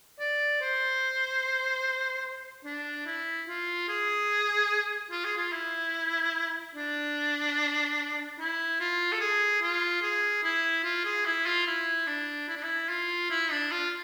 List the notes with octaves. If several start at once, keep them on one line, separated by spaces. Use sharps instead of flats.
D5
C5
D4
E4
F4
G#4
F4
G#4
F4
E4
D4
E4
F4
A4
G#4
F4
G#4
E4
F4
G#4
E4
F4
E4
D4
E4
D4
E4
F4
E4
D4
F4